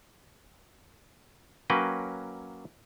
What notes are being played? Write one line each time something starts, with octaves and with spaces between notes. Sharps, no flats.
F#3 A#3 C#4 B4 G5